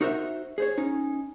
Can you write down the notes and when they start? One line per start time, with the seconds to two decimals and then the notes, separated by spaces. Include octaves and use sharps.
0.01 D#4 F#4 A#4 C5 E5
0.58 G#4 C5 C#5
0.78 C#4 D#4